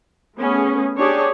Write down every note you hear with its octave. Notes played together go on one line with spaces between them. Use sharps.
A3 B3 C#4 G#4
D4 G4 G#4 C#5 D5